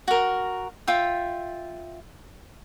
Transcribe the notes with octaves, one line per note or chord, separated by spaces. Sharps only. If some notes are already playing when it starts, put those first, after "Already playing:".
F#4 A#4
F4 E5 G5